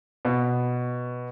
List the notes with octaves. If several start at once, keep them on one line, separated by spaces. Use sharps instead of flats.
B2